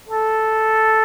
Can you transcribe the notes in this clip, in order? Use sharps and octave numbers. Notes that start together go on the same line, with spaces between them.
A4